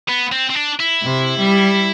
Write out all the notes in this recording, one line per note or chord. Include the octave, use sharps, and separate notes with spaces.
B3
C4
C4
D4
E4
C3
G3